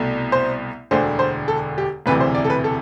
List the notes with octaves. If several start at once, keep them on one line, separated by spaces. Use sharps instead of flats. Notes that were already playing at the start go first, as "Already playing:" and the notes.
Already playing: C2 B2 A3
C5
E1 D2 D3 C5
C5
A4
G4
E1 D2 C3 E3 B4
C5
D5
A4
B4
A4